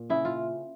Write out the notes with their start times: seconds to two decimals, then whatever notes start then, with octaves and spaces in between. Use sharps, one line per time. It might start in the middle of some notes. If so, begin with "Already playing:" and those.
Already playing: A#2
0.10 C#3 E4
0.25 F4